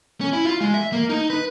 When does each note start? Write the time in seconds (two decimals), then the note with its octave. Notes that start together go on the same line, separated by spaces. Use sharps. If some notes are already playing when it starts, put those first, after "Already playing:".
0.21 C#4
0.33 E4
0.45 F4
0.60 G#3
0.74 E5
0.92 A#3
1.09 D#4
1.30 B4